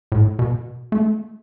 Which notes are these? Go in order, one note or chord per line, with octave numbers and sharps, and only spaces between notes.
A2
B2
A3